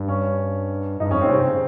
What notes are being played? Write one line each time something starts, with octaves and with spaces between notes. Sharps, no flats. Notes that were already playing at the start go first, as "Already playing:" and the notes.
Already playing: G2
C#4
G2 D#4
F2 C#4
G2 C4
A#2
C3 C4
C#3